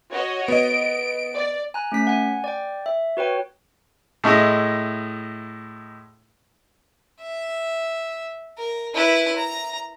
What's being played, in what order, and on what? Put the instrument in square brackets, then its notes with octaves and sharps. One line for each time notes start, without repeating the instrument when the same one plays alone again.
[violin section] F#4 C#5 D#5
[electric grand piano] B3 D#5 [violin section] D7
[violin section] D5
[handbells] G#5 A#5 F#6
A3 C#4 B6
F#5 G#5
D5 G5
E5
F#4 B4 C#5 G5
[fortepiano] A2 G#3 E4 D#5
[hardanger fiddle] E5
A#4
E4 B4
A#5